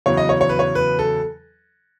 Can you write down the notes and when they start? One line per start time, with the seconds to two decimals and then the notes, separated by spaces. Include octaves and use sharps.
0.06 E2 C#3 F#3 C#5
0.17 D#5
0.29 C#5
0.41 C#5
0.49 B4
0.59 C#5
0.75 B4
0.99 A4